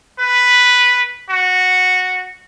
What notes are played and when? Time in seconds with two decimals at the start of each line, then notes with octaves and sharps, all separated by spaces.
0.19 B4
1.30 F#4